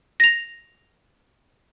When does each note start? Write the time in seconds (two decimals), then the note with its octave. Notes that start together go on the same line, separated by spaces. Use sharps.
0.20 A#6 F7